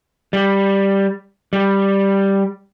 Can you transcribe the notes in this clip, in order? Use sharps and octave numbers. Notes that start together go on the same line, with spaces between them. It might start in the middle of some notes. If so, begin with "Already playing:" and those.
G3
G3